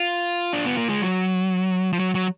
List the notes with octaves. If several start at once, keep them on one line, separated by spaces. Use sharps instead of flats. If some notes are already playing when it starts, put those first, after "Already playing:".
Already playing: F4
D4
B3
A#3
G#3
F#3
F3
F#3
F#3